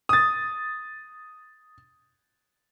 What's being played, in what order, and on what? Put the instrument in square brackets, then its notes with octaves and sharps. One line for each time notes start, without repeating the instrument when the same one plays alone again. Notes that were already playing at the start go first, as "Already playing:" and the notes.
[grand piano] D#6 A6